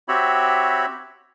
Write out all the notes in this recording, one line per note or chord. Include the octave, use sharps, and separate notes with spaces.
C4 F#4 G4 C#5 E5 B5